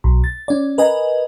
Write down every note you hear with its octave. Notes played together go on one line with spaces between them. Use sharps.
B1
A6
C#4 D5
A#4 B4 D#5 G#5